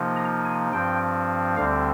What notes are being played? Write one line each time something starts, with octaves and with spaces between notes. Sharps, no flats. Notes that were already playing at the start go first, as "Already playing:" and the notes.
Already playing: C3 F3 A#3 D#4
A#5
G#5
G2 F3 C4 G5
D2 D3 G3 C4 F5